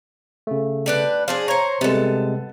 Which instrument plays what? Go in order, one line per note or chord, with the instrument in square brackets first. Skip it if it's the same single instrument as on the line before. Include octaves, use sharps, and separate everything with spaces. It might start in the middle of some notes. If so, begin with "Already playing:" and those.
[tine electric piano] C#3 A3
[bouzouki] G3 D4 B4
[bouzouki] F3 D4 G#4 [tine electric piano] F5
[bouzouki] C5 A#5 [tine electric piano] C#5 G#6 C#7
[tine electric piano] C3 G3 G#3 [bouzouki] B3 A4